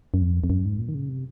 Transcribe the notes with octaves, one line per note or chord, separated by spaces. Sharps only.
F#2
F2
F2
F#2
G#2
A#2
D#3
C#3
C3